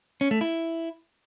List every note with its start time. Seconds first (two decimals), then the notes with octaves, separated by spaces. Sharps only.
0.21 C#4
0.31 A3
0.41 E4